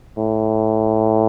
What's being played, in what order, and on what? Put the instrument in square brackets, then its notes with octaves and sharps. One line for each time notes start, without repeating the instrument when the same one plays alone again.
[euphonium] A2